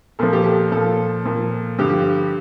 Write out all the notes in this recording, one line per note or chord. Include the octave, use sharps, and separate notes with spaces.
A#2 F3 A4
G4
A4
A#2 F3 A4
A#2 F3
G2 D3 F3 G4